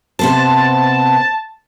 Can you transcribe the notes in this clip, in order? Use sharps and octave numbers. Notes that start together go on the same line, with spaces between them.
C3 B3 C5 A5